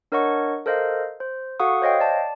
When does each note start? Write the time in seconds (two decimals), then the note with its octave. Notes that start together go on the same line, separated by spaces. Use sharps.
0.12 D4 A#4 C#5 D#5 F#5 C#6
0.66 A4 A#4 C5 D#5 F5
1.20 C5
1.60 F#4 A4 F5 F#5 C#6 D#6
1.82 C5 C#5 D#5 F5 G5
2.00 D5 A5